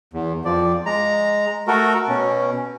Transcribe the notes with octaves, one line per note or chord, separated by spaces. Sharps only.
E2
F2 F3 D5
G#3 A#5
A3 F#4 A4 A#4
B2 C#4